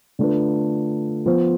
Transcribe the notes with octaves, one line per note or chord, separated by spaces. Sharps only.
D3 A3 D4 F4 B4
F3 B3 F4 C5